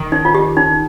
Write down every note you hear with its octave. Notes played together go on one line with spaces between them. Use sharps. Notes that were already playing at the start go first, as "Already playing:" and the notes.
Already playing: D#3
D#4
F4
G4
D#4